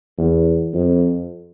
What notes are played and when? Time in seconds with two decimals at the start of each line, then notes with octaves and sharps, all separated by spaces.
0.18 E2
0.73 F2